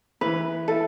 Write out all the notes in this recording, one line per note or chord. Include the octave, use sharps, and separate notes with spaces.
E3 B4
E4 A4